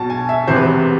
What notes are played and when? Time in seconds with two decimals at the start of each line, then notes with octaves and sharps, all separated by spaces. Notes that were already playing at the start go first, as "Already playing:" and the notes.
Already playing: B1 B2 A5
0.10 G#5
0.29 E5
0.47 E1 E2 C3 E3 C5
0.56 B4
0.64 C5